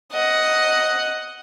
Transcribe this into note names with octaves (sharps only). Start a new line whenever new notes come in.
D#5 F#5